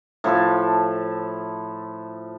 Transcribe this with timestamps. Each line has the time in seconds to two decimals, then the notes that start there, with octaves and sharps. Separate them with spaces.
0.24 A2 F3 E4 A4